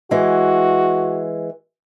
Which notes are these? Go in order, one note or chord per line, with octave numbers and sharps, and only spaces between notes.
E3 G#3 F#4